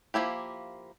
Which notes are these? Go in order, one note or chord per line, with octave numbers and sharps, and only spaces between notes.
F3 F#3 A#3 E4 G4